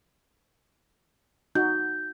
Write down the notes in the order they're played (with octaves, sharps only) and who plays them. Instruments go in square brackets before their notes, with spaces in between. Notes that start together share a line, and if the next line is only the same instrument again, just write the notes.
[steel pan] D#4 F#4 [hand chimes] G6